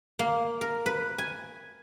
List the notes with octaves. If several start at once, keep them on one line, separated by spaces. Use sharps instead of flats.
A#3
A#4
B4
G#5